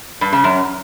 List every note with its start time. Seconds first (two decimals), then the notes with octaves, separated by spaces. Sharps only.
0.21 G2
0.33 C#3
0.44 F#2